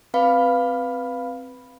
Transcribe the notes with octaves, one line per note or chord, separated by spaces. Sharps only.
C4 B4 F5 B5